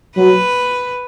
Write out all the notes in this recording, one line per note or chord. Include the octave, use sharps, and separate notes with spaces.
F#3 B4